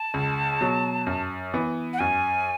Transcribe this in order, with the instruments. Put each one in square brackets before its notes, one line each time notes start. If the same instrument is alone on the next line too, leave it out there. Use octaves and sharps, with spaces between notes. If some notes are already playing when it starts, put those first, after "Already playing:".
Already playing: [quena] A5
[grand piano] C#2
B2 F#3
F#2
E3 B3
[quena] F#5
[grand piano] F#2 [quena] G#5